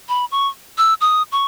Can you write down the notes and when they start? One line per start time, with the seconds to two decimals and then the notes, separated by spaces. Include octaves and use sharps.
0.09 B5
0.32 C#6
0.78 E6
1.01 D#6
1.32 C#6